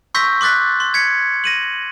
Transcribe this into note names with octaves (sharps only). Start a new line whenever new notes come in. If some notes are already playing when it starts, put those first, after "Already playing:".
C6 C#6 E6 G6 A#6 B6
C6 D6 F#6 A6 B6
C6
G#6 B6 C#7
A#6 D#7 F#7